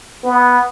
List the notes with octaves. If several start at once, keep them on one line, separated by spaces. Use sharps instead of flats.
B3